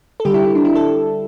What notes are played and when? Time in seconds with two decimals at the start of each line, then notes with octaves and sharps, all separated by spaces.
0.20 A4
0.25 D3 G3 G4
0.34 E4
0.45 E4
0.55 D4
0.65 E4
0.75 A4